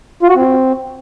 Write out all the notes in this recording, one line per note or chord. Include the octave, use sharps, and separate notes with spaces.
F4
F#4
C4